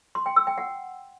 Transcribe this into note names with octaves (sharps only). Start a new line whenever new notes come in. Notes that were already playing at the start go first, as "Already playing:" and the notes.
C6
G5
E6
G5
F#5